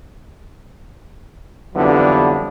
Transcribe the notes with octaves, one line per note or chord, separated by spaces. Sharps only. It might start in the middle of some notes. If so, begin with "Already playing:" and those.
F2 D3 E3 F#3 G3 B3